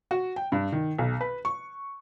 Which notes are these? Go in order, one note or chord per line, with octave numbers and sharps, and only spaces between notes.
F#4
G5
G2
D#3
B1
B4
C#6